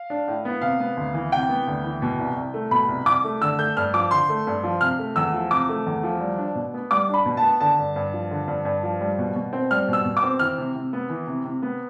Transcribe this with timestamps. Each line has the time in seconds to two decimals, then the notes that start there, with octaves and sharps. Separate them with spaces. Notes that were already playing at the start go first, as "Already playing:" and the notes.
Already playing: F5
0.10 D4
0.28 A2
0.45 B3
0.61 C3 F5
0.80 B3
0.97 D2
1.14 E3
1.32 C3 G5
1.49 B3
1.67 D2
1.84 E3
2.02 B2
2.19 C2
2.36 C2
2.54 A3
2.71 B2 B5
2.89 C2
3.06 C2 D6
3.24 A3
3.42 D3 E6
3.58 A3 G6
3.77 G2 F6
3.94 F3 D6
4.11 D3 C6
4.29 A3
4.47 G2
4.64 F3
4.81 C3 F6
4.99 A3
5.16 E2 E6
5.33 F3
5.51 C3 D6
5.69 A3
5.87 E2
6.03 F3
6.20 G3
6.38 D4
6.55 B2
6.74 B3
6.91 G3 D6
7.09 D4 B5
7.26 B2
7.37 A5
7.43 B3
7.60 D3 A5
7.78 G2
7.96 G2
8.13 F3
8.31 D3
8.48 G2
8.65 G2
8.83 F3
9.01 G3
9.18 B2
9.36 B2
9.53 C4
9.71 G3 F6
9.88 B2 E6
10.05 B2
10.17 D6
10.23 C4
10.39 E3 F6
10.58 C3
10.75 C3
10.93 B3
11.09 E3
11.27 C3
11.45 C3
11.62 B3